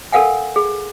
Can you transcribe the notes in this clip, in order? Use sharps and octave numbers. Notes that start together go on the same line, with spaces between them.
A4 A#4 F5 F#5 G#5
G#4